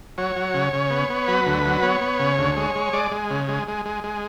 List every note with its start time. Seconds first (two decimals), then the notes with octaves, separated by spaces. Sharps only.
0.18 F#3 C#5
0.36 F#3
0.54 C#3
0.73 C#3
0.90 B3
1.10 B3
1.28 F#3 B4
1.47 D2
1.65 F#3
1.82 B3 C#5
2.01 B3
2.19 C#3
2.38 D2
2.57 G#3
2.75 G#3
2.93 G#3 D5
3.11 G#3
3.30 C#3
3.48 G#3
3.68 G#3
3.85 G#3
4.04 G#3